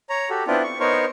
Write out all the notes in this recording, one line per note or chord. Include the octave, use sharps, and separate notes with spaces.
C#5 A#5
F#4 G4 A4
B3 C4 D4 E4 F4
C#6
B3 D#4 A#4 C5 C#5 C#6